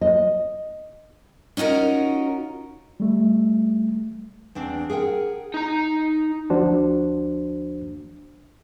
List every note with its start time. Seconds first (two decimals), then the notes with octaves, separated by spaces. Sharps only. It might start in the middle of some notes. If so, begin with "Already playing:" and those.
0.01 D#5
1.57 C#4 D#4 F4 F#4 A#4
3.00 G3 A3
4.55 E2 C4 D4
4.90 G#4 A#4 F#5 G5
5.54 D#4 A#5
6.50 D2 F3 D4 F#4 C5